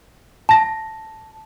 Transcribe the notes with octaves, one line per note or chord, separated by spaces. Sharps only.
A5 A#6